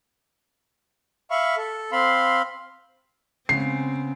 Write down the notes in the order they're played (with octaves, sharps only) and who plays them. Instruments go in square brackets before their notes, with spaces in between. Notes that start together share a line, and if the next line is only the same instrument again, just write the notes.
[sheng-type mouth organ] E5 F5 B5 C#6
A4
C4 F5 B5 C6
[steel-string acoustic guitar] C#3 G#3 B3 [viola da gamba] C4 [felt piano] C7